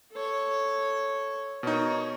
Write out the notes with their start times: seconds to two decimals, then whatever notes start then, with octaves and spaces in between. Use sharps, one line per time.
0.12 A4 C#5
1.63 B2 D#4 A#4 C#5